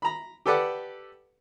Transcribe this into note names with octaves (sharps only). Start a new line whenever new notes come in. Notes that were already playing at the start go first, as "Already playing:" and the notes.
A#5 B5
G4 A4 B4 D5 F#5